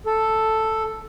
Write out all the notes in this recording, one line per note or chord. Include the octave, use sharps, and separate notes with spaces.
A4